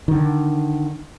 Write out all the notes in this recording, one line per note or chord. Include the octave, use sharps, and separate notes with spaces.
D3 D#3